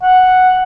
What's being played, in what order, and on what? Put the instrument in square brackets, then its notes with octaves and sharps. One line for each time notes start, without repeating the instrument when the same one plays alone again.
[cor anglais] F#5